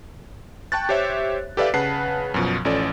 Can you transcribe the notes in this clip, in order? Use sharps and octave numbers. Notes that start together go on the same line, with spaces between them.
G5 A5 C#6 F#6 A6
G4 C5 C#5 E5
G4 A4 B4 D5 E5 F5
C#3 B4 F#5 A5 F#6 C7
F#2 B2 F3
A1 F3 C#4 A4 D5